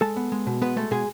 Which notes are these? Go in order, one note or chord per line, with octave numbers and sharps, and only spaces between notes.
G#3 A4 A5
B3
G#3
B2
G#3 B3 B4
G#3 A3 A4
B2 G#3 G#4